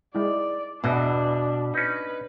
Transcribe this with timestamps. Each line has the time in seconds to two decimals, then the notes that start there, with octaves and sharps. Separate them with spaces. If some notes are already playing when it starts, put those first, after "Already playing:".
0.15 G#3 E4 D5
0.84 E2 B2 E3 B3 D4 E5
1.74 C#4 D#4 B4